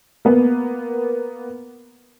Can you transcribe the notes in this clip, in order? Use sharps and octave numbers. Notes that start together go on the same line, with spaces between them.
A#3 B3